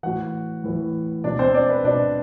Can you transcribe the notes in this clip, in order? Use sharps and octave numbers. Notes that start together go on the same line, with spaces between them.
A2 E3 F#4 F#5
A2 E3
B2 D4 D5
C4 C5
D4 D5
B4
B2 D4 D5